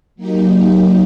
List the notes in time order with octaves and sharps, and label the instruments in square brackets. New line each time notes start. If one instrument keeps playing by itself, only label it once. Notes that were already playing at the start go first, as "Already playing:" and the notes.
[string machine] F#3 A#3 D#4 G4